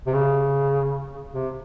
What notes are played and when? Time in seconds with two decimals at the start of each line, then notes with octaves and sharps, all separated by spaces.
0.07 C3
0.14 C#3
1.34 C3